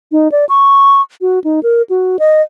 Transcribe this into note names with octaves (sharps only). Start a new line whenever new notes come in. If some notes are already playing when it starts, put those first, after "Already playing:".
D#4
D5
C#6
F#4
D#4
A#4
F#4
D#5